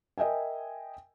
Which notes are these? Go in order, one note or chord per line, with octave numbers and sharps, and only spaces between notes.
A#4 D#5 E5 G5 G#5